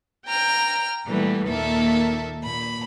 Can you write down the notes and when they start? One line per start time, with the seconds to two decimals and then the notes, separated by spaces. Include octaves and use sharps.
0.27 G5 A#5 F6
1.05 A#2 E3 G3 A3 B3
1.46 D#2 A#2 D#3 A#3 A4 E5
2.41 A#2 B5